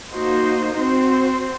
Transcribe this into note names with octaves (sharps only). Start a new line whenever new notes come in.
A#3 D#4 F#4 C5
C4 F#4 C5